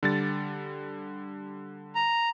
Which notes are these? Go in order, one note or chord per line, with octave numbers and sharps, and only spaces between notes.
D3 G3 A6
A#5